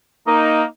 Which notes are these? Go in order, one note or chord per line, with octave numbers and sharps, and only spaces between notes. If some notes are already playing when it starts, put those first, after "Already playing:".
A#3 D#4